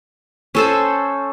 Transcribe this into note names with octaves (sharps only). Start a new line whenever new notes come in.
C#4 A4 C5